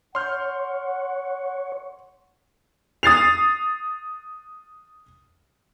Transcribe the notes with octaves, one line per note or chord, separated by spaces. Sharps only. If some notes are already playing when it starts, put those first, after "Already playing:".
C#5 F#5 C6 F6 G6
D#6 A6 C7 F7